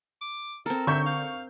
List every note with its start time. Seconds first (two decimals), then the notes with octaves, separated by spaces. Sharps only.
0.21 D6
0.66 C4 A4 A#4
0.87 D3 E5 C#6 G6
1.06 F5